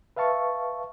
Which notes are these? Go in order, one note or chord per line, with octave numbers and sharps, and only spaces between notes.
B4 E5 F5 A5 C#6